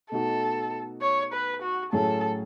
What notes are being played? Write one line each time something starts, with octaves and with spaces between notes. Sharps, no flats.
B2 A3 D#4 F#4 A4
C#5
B4
F#4
A2 F#3 C#4 E4 G#4 A4